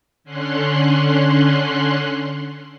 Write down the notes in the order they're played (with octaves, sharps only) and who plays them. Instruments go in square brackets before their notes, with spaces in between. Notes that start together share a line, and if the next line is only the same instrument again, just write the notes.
[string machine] D3 C#4 C6 F#6